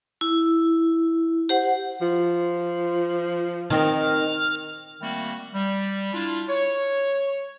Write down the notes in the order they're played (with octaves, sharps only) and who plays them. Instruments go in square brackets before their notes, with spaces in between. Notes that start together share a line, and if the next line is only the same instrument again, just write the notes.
[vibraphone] E4
G4 C5 F#5
[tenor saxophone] F3 [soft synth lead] F4
[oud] D#3 C4 [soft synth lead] D#5 [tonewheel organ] F6
[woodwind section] D#3 G3 A3 A#3 C4 F#4
G3
D4 E4 F4
C#5